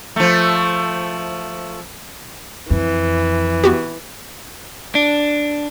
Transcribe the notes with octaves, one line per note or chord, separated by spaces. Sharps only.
F3 A3
F2 E3
B3 F#4 G4
D4